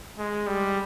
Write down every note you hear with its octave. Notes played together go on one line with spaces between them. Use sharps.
G#3
G3